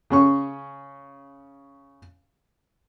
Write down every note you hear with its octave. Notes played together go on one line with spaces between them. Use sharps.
C#3 C#4 C#6